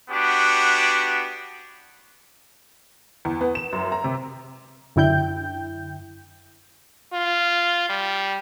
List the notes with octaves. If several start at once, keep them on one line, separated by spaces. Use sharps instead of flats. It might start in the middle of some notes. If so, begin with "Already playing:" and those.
B3 D4 F#4 G4
E2
B3
E7
F#2
A#5
C3
F#2 D3 E4 G5 G6
F4
G3